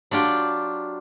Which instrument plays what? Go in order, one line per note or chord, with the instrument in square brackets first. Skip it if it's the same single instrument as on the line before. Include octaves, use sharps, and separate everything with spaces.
[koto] F#3 D4 F4 G4